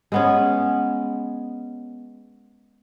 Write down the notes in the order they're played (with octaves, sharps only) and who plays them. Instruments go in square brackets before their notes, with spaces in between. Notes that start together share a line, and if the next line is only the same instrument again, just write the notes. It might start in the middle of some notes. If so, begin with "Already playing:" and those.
[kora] G#3 B3 C#4